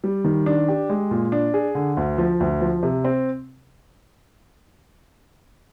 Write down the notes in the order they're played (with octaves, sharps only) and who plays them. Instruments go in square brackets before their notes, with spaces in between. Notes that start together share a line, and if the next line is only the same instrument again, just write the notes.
[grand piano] G3
D#3
D4
G4
G#3
A#2
D4
G#4
D3
D2
F3
D2
F3
C3
C4